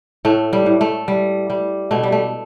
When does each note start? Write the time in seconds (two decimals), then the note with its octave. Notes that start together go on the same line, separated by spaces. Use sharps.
0.25 A2 A3
0.53 G3
0.66 A2
0.81 A3
1.08 G3
1.50 G3
1.91 B2 A3
2.03 G3
2.12 A3